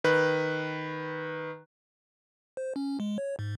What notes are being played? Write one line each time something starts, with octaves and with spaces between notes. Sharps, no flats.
D#3 B4 F#6
C5
C#4
G#3
C#5
G#2